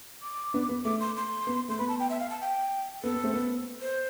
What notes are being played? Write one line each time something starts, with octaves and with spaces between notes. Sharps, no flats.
D6
B3 D4
B3
A3 D6
C6
C6
B3
A3 C6
B3 B5
A5
G5
E5
F5
A5
G5
B3 A4
B3
A3 C4
B3
C5